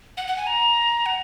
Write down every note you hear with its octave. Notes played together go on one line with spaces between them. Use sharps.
F#5
F#5
G#5
A#5
F#5